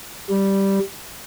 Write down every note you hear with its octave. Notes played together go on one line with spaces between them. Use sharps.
G3